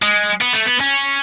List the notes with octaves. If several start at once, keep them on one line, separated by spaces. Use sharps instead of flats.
G#3
B3
A3
B3
C#4